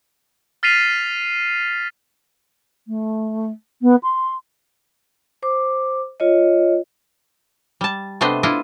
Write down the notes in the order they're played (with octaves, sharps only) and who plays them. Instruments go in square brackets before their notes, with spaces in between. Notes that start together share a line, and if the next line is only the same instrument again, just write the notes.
[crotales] F6 A6 B6 C7 D#7 F7
[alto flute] A3
B3
C6
[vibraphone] C5 D6
F4 C#5 D#5
[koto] G3 A5
C3 A3 B3 D4 C5 D#5
D4 E4 F4 D#5